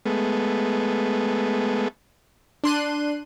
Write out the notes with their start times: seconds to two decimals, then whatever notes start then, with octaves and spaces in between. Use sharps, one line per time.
0.06 G#3 A3 B3
2.64 D4 C6 F#6 D#7